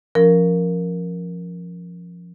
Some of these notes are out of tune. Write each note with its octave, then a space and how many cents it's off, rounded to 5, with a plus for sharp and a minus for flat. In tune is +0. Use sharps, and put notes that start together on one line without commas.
F3 +0 C#4 +0 A#4 +0